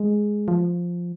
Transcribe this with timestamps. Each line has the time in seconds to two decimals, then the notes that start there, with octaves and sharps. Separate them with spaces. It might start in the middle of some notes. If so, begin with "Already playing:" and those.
Already playing: G#3
0.48 F3